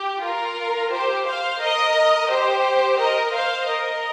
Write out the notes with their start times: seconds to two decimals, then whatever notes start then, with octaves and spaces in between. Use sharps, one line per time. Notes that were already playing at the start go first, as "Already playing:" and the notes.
Already playing: G4
0.22 F4 A#4
0.91 G4 C5
1.27 C5 F5
1.61 A#4 D#5
2.30 G4 C5
2.99 A#4 D#5
3.33 C5 F5
3.68 A#4 D#5